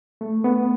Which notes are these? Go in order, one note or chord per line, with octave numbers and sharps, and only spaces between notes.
A3
B3